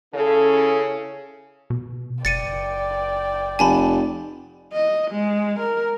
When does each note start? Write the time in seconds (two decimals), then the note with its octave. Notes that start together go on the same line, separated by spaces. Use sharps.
0.14 C#3 C#4 E4 A4
1.70 B2
2.25 F#1 D5 G5 A6 C#7 D#7
3.59 F1 G#5 A5 B5
4.73 D#5
5.11 G#3
5.59 A#4